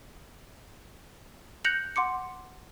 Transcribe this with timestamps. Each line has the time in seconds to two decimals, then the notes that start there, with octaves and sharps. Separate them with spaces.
1.65 F#6 G6 A#6 C#7 F7 F#7
1.96 F#5 C6 D6 C#7